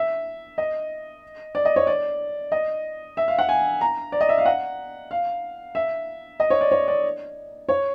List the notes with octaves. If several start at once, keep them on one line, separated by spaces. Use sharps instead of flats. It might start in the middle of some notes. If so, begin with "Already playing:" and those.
Already playing: E5
D#5
D5
D#5
C#5
D5
D#5
E5
F5
F#5
G#5
A#5
D5
D#5
E5
F5
F#5
F5
E5
D#5
C#5
D5
C#5
D5
C#5